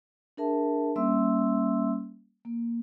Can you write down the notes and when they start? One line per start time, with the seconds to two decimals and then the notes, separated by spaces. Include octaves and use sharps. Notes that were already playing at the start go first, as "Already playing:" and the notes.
0.37 D4 G#4 A#4 E5 A5
0.96 G3 A#3 C#4 E5 C6 E6
2.45 A#3